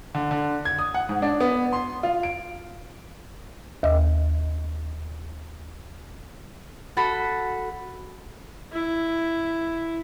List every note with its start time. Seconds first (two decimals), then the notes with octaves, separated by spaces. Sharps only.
0.15 D3
0.31 D3
0.65 G#6
0.79 D#6
0.94 F#5
1.09 G#2
1.22 D4
1.41 B3
1.73 C6
2.03 F4
2.23 D7
3.83 D#2 D#5
6.97 F#4 A4 B5
8.73 E4